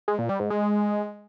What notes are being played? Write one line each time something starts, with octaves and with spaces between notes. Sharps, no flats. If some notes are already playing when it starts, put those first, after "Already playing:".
G#3
A#2
G3
G#2
G#3